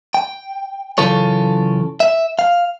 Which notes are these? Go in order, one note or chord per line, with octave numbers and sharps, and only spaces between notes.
G5
F#2 C#3 E3 F4 A4 C#5
E5
F5